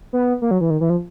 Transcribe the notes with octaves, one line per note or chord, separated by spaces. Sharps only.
B3
A#3
F#3
E3
D#3
E3
F3